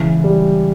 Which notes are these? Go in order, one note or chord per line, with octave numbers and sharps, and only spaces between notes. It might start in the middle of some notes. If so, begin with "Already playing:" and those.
Already playing: C#3 E3 G#3
G3